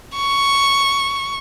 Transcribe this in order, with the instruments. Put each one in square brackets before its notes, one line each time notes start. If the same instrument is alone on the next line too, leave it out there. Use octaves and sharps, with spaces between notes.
[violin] C#6